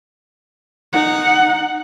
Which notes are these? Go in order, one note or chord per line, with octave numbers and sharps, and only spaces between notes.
D#4 F#5